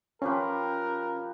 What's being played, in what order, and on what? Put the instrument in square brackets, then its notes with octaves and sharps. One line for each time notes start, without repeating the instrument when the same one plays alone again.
[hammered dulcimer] F3 G4 B4 [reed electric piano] C#4 [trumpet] A#4